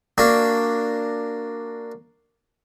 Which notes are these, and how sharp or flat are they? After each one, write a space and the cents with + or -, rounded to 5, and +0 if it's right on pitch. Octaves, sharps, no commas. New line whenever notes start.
A#3 -10 D4 +0 F#4 +0